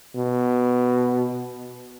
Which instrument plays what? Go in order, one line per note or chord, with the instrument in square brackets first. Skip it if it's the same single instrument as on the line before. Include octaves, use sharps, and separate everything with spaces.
[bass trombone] B2